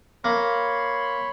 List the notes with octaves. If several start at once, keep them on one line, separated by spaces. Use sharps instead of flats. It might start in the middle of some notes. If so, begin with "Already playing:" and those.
A#3 C#5 B5 C6